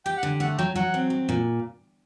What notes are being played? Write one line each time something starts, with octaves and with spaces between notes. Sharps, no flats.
G4 G5
F#5
D3
A3 F#5
F#3 G5
F#3 F#5
C4
F#3
A#2